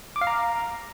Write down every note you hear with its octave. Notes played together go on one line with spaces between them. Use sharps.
D6
F5
A#5